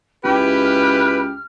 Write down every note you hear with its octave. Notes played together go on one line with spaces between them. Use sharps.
C#2 E4 G4 B4 F6